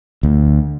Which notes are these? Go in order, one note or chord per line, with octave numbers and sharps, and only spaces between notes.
D2